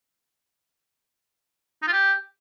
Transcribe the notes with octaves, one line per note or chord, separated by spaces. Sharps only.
D#4
F4
G4